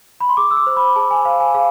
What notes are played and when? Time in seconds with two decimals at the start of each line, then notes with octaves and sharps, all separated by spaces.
0.20 B5
0.29 C6
0.37 G#4 D6
0.51 E6
0.57 D6
0.67 C5
0.76 B5
0.96 G#4 A5
1.11 G#5
1.25 C5 F5
1.40 G#5
1.54 G#4 F5